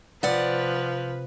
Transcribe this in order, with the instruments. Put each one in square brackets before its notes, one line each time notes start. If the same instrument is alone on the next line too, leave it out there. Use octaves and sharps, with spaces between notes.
[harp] C3 [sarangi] F3 [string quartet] B4 [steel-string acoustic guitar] D5 F#5